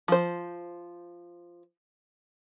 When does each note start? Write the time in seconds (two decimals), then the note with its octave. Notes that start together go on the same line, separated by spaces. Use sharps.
0.08 F3 C5